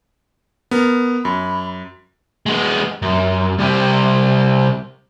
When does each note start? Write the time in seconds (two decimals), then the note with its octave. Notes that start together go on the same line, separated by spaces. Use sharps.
0.71 B3 A#4
1.25 F#2 B5
2.46 G#3 B3
3.02 F#2
3.59 C2 C3